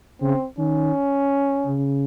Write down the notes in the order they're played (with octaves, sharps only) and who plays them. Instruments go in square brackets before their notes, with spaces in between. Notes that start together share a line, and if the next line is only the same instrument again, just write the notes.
[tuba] C#3 [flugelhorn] C4
[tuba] D#3 [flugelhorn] C#4
[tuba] C#3